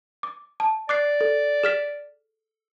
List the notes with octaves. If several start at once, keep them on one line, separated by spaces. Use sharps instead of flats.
D6
A5
D5 D6 F#6 C7
A4
G#4 F6 B6